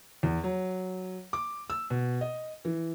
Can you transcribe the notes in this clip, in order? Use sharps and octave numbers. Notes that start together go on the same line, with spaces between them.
E2
F#3
D6
E6
B2
D#5
E3